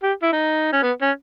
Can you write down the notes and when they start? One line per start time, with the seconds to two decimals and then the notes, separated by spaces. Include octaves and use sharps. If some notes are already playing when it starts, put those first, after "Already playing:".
0.03 G4
0.22 E4
0.33 D#4
0.72 C#4
0.82 B3
1.02 C#4